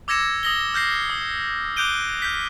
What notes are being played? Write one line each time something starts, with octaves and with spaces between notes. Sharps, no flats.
D6 E6 G#6 A#6 C#7 E7
D#6 A#6 G7
F6 G6 A#6 C7
D#6
D6 F#6 G6 D7 D#7 G7
F6 G6 B6